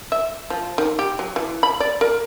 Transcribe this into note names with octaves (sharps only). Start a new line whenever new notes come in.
E5
F3
D#3
G4
F#3
E3
B5
D5
A#4